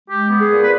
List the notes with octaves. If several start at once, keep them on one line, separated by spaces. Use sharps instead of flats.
G#3 G4
B3
G#4
A#2
B4